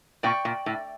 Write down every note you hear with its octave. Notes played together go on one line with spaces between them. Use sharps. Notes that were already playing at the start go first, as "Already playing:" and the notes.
A#2 D5 G5 C#6
A#2
A2